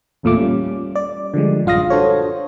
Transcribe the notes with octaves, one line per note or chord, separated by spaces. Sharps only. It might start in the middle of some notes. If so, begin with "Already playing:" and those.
G1 E2 A#2 A3 F4 D6
G3 C#4
D5
D3 F3 G3 G#3
A1 F#2 F4 F5 D#6 A#6
D4 F#4 A4 C5 C#5